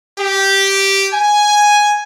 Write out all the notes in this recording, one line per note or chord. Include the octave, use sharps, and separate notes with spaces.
G4
G#5